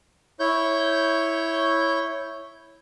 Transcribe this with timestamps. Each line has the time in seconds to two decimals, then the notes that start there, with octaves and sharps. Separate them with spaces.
0.40 E4 C#5 G6